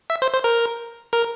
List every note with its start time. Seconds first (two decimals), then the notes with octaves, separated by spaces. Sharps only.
0.10 E5
0.22 C5
0.33 C5
0.44 A#4
1.13 A#4